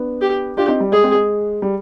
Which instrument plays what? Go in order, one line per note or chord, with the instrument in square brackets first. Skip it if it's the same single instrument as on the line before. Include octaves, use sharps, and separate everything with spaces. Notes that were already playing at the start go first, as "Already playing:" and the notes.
Already playing: [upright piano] B3 D4
[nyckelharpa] G4
[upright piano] D4 F4 [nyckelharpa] G4
[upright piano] C4 D#4
G3
[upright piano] G#3 [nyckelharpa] G#4
[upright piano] G#3 C4
G#3
G3